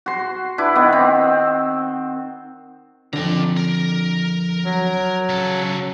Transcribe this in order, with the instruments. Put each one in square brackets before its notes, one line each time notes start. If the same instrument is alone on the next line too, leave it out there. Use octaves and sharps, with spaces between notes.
[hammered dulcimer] F#4 C6
D4 E4 B4
D#3 B3
C4
[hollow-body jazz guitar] F2 D3 [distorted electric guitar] D5 A#5
[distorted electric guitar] A#4
[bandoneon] F#3
[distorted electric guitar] C#3 A4